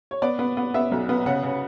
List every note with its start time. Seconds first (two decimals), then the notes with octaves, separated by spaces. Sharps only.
0.11 C#5
0.22 B3 D5
0.39 B3
0.57 B3
0.74 B3 E5
0.91 B1
1.09 B3
1.26 C#3 F#5
1.43 C#3